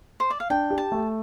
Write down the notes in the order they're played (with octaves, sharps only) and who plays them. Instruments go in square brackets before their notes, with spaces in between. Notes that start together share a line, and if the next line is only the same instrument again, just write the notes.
[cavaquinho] C5
D5
F5
[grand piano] D4 [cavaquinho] G5
[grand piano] G4
[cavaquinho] A5
[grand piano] A3